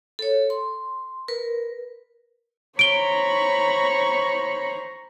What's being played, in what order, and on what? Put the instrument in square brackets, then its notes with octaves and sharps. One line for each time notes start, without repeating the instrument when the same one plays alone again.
[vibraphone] A4 C#5
C6
A#4 B4
[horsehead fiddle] C5 A#5 [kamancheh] C#5 B5 [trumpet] C#6 [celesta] D7 G7